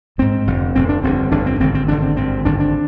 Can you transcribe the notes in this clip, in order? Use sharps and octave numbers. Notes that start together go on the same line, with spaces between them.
A#1 G#2 C4
F1 F2 D3
F1 F2 D3 C4
D4
G1 F2 D3 C4
G1 F2 D3 D4
C4
G#1 G2 D3 C4
C4
G#1 G2 D3 D4
C4
G#1 G2 D3 C4
G#1 G2 D3 D4
D4